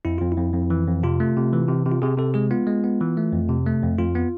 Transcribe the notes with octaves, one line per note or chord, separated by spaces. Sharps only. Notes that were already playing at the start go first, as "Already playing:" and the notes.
F2 E4
F2 F4
E4
F2
F2
E3
F2
C3 F4
A3
C3
E3
C3
C3
F4
C3 G#4
C3 A4
G#3 G#4
B3 F4
G#3
B3
E3
A3
F2
C3
A3
F2
F2 F4
B3